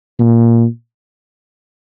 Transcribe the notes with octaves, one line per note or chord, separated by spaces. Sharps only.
A#2